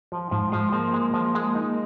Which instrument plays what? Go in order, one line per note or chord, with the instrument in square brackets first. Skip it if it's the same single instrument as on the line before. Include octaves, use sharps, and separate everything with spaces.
[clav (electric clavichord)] F3
[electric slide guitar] G#2 [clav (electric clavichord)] F3
[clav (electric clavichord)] F3 [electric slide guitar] G#3
[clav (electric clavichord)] F3 [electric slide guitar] A#3
[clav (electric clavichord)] G#3
F3
G#3
D#4